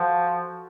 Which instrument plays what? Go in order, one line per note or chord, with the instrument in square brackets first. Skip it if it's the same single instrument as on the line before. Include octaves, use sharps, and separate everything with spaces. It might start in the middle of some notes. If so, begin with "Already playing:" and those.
Already playing: [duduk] F3 [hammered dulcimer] F#4 A4 B4 C#5